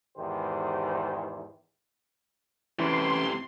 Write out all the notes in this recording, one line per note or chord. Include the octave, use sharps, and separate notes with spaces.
E2 G#2 D#3 G4 C5
A2 C3 E3 C#4 E5 G5 C6